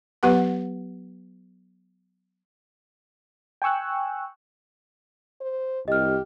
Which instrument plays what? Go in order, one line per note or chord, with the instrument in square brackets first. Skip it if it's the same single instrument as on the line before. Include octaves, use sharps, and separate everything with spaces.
[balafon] F#3 B3 G4 B4 F#5
[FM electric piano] G5 G#5 C#6 E6 F#6
[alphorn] C5
[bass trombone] C2 [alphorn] G4 [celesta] D#5 F6